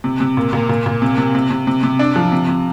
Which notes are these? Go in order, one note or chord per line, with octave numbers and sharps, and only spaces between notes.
C3
C3
A#2
A#2
A#2
A#2
C3
C3
C3
C3
C3
C3
D4
F3
C3
C3